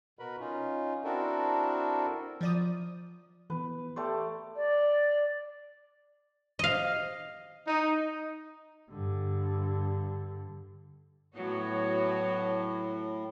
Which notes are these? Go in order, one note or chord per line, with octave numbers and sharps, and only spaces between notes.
B2 F#4 A#4 B4 B5
C#4 D#4 F4
C4 D4 E4 F#4 A4 A#4
F3 D5 D#6
E3 B3 B4
A3 G4 D5 C6
D5
D#5 F5
D#4
G2 D3
A2 F#3 B3 F#4 C#5